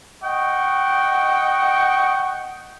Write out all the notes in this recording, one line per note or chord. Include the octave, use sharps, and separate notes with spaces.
D#5 F#5 G5 C#6